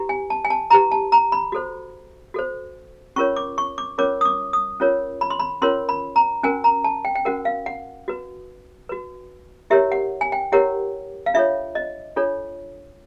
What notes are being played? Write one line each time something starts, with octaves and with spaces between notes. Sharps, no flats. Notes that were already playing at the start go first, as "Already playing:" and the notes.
Already playing: E4 G4 B4
G#5
A5
G#5
A5
E4 G4 B4 A#5
A5
A#5
B5
F#4 A4 C5
F#4 A4 C5
C#4 F4 A#4 C#5 C#6
D6
C#6
D6
C#4 F4 A#4 C#5 D6
D#6
D6
D#6
C#4 F4 A#4 C#5
B5
C6
B5
C#4 F4 A#4 C#5 C6
B5
A#5
C#4 F#4 A#4 G#5
A#5
A5
G5
G5
C#4 F#4 A#4 F#5
F5
F#5
F#4 B4
F#4 B4
E4 G4 A#4 C#5 E5
F#5
G#5
G5
E4 G4 A#4 C#5 F#5
F5
D4 F4 A4 C#5 E5
D#5
D4 F4 A4 C#5